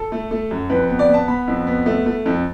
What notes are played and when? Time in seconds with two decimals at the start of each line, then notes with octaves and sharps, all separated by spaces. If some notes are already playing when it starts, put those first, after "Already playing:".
Already playing: A4
0.12 A3
0.31 A3
0.51 F#2
0.70 F2 B4
0.89 B3
0.99 D5
1.09 B3 A5
1.28 B3 B5
1.48 F2
1.67 B3
1.86 A3
2.06 A3
2.26 F2